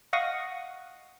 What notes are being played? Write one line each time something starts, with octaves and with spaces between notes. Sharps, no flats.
D#5 F5 F#5 C#6 D#6 A#6